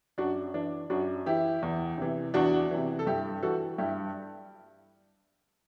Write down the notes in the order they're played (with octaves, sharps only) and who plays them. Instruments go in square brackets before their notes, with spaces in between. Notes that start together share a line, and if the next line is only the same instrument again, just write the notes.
[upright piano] F#2 D4 F#4
E3 D4
F#2 D4 F#4
E3 E4 G4
E2
C3 E3
E2 D4 F#4
C3 E3
A4
G2 E4 G4
E3 F#4 A4
G2 E4 G4